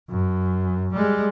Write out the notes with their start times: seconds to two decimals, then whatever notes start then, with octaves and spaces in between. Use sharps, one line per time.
0.10 F#2
0.94 G3 G#3